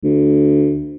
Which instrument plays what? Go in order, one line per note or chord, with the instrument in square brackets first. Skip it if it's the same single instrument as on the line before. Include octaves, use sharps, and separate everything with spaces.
[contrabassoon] D2